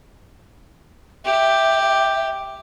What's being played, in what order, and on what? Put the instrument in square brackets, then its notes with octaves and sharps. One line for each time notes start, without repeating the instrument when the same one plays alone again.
[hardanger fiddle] G4 [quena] E5